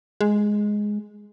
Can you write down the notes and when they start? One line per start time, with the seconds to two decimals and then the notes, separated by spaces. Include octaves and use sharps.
0.21 G#3